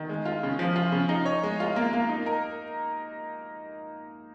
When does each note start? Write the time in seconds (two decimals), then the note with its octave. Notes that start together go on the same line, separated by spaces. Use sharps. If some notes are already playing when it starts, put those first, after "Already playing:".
Already playing: D#3
0.09 G#3
0.25 F4
0.43 C#3
0.59 F3
0.76 F4
0.92 C#3
1.09 D#4
1.25 C#5
1.43 G#3
1.60 F4
1.76 A#3
1.93 A#3
2.09 D#4
2.26 A#4